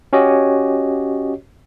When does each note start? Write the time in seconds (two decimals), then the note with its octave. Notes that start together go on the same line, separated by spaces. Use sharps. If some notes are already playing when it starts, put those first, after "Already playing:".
0.13 C#4 F#4 G4 C#5 D#5